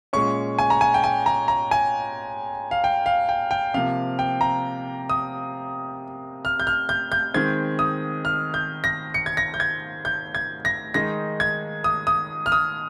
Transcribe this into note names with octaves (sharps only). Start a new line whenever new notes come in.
A#2 G#3 C#4 C#6
G#5
A#5
G#5
G5
G#5
A#5
A#5
G#5
F5
G5
F5
G5
G5
C3 F3 A#3 F5
G5
A#5
D#6
F6
G6
F6
G6
G6
D#3 G#3 C4 G#6
D#6
F6
G6
A#6
C#7
G#6
A#6
G6
G#6
G6
G#6
A#6
D#3 G#3 D#4 A#6
G#6
D#6
D#6
F6
D#6